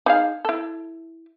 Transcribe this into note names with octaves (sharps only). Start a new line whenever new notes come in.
D#4 G#4 F5
E4 A4